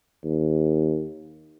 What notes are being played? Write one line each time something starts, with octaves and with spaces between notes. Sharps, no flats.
D#2